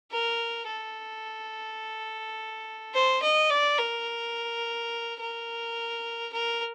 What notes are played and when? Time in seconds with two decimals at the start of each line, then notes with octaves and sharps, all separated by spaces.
0.12 A#4
0.68 A4
2.94 C5
3.22 D#5
3.50 D5
3.78 A#4
5.20 A#4
6.33 A#4